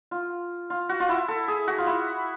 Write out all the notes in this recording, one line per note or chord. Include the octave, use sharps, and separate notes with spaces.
F4
F4
F#4
F4
E4
A4
G#4
F#4
F4
E4